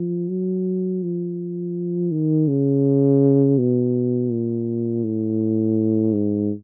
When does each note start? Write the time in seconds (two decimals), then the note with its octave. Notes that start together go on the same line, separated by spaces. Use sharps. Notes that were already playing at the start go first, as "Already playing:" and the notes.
Already playing: F3
0.29 F#3
1.03 F3
2.11 D#3
2.48 C#3
3.58 B2
4.31 A#2
5.04 A2
6.13 G#2